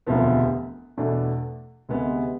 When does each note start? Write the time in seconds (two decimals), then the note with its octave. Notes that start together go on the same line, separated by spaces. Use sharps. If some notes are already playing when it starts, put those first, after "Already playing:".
0.07 E1 D2 C3 F3 B3
0.97 E2 B2 A3 D4
1.89 D2 C3 G#3 B3